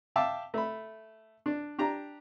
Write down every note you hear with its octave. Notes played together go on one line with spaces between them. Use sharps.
E5 F5 G5 A5 D6 E6
A3 B5
D4
D4 G4 A#5